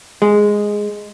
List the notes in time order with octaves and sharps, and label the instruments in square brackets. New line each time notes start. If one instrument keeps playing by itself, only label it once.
[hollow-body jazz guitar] G#3